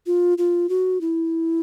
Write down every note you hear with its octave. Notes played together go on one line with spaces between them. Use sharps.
F4
F4
F#4
E4